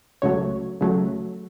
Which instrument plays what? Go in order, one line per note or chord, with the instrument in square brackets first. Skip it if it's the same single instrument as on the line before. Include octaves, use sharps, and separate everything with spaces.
[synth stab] C#2 C#3 F#3 A3 C#5
C#2 C#3 F#3 A3